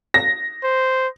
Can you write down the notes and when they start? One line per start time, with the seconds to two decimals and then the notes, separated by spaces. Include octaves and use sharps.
0.14 A#6
0.64 C5